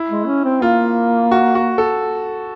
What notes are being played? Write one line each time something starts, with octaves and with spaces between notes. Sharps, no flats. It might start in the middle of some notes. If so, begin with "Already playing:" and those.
Already playing: E4
G#3
C#4
C4
A#3 F4
F#4
F#4
A4